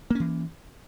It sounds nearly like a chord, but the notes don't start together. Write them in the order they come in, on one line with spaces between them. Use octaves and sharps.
A#3 C#4 E3